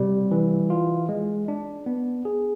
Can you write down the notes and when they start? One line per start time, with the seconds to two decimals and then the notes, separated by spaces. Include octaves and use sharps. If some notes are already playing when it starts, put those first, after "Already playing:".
Already playing: C3 G3
0.31 E3
0.70 F4
1.09 G#3
1.48 D4
1.86 B3
2.25 G#4